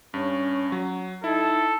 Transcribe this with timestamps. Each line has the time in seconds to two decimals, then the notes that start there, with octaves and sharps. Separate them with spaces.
0.14 G2 C#4
0.72 F#3
1.24 D#4 E4 A4